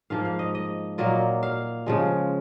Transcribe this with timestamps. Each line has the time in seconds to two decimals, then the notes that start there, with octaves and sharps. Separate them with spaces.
0.10 G#2 F3 A#3 F5
0.25 F5
0.39 D#5
0.55 D#5
0.98 A#2 F#3 A#3 F4 D#5
1.43 F5
1.86 C#3 F3 G#3